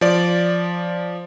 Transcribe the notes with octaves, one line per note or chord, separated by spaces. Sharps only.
F3 D5